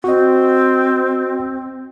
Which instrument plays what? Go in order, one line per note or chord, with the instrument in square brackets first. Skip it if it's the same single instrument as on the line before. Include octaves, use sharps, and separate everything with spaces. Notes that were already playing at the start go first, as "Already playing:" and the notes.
[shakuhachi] C4 [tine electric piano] F#4 D#5